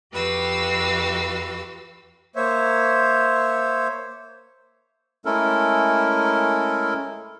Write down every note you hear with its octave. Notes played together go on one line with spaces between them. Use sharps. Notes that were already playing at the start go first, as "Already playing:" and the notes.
F2 F#4 G4 B4 F5 E6
A#3 C5 C#5 E5
G#3 A3 C#4 E4 A4 A#4